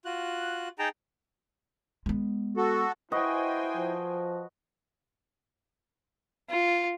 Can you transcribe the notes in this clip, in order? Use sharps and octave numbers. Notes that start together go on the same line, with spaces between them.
F4 F#4 F#6
D#4 G#4 G5 A5 A#5
G#3 B3
F#4 A4
E4 F#4 B4 C5 D#5 G5 G#5
F3
F4